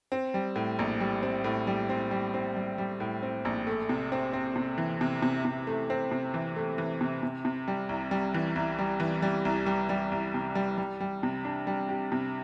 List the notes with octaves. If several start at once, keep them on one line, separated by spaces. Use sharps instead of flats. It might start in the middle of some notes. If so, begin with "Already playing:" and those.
C4
G3
A2
A#1
G3
C4
A2
G3
C4
G3
C4
G3
G3
A2
C4
A#1
A3
C3
C4
C4
C3
E3
C3
C3
C3
A3
C4
C3
E3
A3
E3
C3
C3
C3
G3
C2
G3
E3
C2
G3
E3
G3
C2
G3
G3
C2
C3
G3
G3
G3
C3
D4
G3
G4
C3